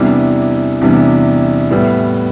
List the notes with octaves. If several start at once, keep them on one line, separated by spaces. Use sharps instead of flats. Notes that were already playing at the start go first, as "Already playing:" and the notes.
Already playing: E2 C3 E3 G3 D4
E2 C3 E3 G3 D4
A2 G3 B3 E4